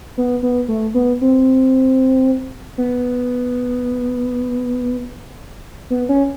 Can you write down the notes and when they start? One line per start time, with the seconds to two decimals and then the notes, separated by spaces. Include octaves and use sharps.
0.18 B3
0.43 B3
0.68 A3
0.94 B3
1.21 C4
2.78 B3
5.90 B3
6.09 C#4